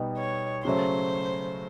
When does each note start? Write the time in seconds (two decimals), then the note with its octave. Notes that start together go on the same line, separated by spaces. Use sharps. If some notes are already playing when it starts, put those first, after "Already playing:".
Already playing: B2 G3 B3 D#4
0.18 C#5
0.65 C#3 F#3 A3 C5